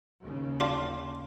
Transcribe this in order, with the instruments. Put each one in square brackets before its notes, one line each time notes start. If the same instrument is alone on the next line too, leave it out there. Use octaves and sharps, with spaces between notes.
[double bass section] D#2 C#3
[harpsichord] D4 F4